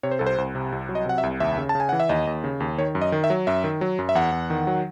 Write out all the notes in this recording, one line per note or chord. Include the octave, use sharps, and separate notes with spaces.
C3 C#5
C5
C2 A4
C5
C2
C3
C2
F#3
D#5
C3 F#5
E5
C2
D#2 E5
C#3
A5
C#3
G#5
E3 F#5
E5
D#2 D#5
D#2
C#3
D#2
D#3 C#5
F#2
D#5
D#3
E5
F#3
F#2 E5
D#3
F#3
F#2
E5
E2 F#5
E2
D#3
F#3